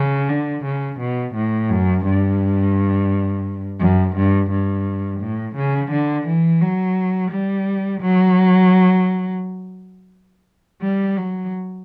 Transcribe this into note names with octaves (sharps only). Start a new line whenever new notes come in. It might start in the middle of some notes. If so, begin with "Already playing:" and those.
Already playing: C#3
D3
C#3
B2
A2
F#2
G2
F#2
G2
G2
A2
C#3
D3
E3
F#3
G3
F#3
G3
F#3